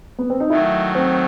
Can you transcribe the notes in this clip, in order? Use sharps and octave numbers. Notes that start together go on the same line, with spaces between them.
B3
C4
D#4
D#3 F#3 A3 E4
C4